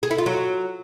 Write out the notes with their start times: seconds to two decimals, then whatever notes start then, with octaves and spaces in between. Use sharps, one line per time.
0.03 G#4
0.11 E4
0.18 F4
0.26 F#3